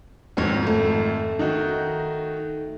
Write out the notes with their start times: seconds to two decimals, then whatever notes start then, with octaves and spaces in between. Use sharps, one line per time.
0.37 F2 G#2 D#3 C4 F#4 C#5
0.67 A3
1.39 D#3 D#4 F#4